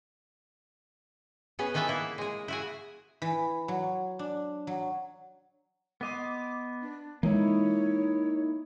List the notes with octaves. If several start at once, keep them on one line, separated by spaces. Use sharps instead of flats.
B3 C#4 G#4
D#3 E3 B3 A4 B4 E5
A#3 E4
G#3 G#4
E4 F#4 G#4
E3
F#3
D4
F#3
B3 D#5 C6 D6
D4
E3 G#3 A#3 D#4 E4 C#5